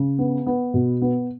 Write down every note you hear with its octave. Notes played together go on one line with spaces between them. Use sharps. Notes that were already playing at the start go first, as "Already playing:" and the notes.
Already playing: C#3
B3
B3
B2
B3